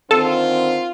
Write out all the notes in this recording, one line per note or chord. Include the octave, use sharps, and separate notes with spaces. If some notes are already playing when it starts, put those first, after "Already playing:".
D3 D#3 C4 F4 A4